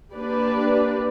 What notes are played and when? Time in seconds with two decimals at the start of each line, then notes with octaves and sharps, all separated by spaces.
0.13 A#3 D4 G4 B4 D5